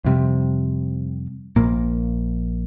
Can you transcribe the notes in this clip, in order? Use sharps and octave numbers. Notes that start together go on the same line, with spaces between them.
F2 C3 G3
A#1 A#2 A#3